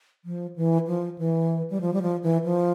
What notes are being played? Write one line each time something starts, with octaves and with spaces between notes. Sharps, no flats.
F3
E3
F3
E3
G3
F3
G3
F3
E3
F3